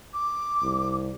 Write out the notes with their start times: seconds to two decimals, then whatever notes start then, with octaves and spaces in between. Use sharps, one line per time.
0.13 D6
0.62 C2